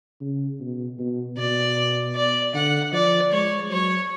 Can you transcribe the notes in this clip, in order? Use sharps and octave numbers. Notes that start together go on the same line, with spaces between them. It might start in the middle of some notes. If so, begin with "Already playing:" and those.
C#3
B2
B2
B2 D5
D5
D3 F#5
F3 D5
G#3 C#5
F#3 C#5